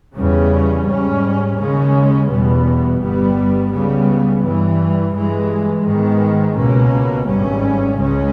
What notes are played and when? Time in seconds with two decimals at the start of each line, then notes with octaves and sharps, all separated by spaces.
0.16 E2 C#3 G3 C#4
0.86 G#2 G3 C#4
1.58 D#2 C#3 G#3 C#4
2.28 E2 B2 G3 B3
3.00 G1 G2 G3 B3
3.72 C#2 C#3 G3 B3
4.43 G2 E3 G3
5.14 G2 E3 G#3
5.85 G#2 D#3 G#3 B3
6.56 C#2 B2 A#3 C#4
7.28 G#1 G2 G3 C#4
7.98 C#2 C#3 G#3 C#4